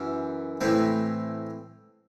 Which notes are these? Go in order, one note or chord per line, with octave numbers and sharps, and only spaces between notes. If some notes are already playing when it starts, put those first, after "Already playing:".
Already playing: F#2 E3
A2 E3 C4